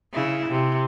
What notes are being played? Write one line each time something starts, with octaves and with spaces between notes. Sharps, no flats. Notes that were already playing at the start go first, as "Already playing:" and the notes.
C#3 E4
C3